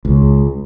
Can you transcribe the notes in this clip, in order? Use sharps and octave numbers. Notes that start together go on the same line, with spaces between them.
C#2